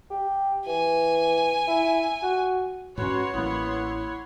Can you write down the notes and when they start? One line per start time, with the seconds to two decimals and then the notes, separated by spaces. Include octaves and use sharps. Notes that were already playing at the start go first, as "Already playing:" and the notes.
0.10 G4
0.67 E3 G#5
1.68 E4
2.23 F#4
2.98 G#2 C#4 F#4 B4 C#5 F#5 C6
3.34 A1 A#3 B3 E4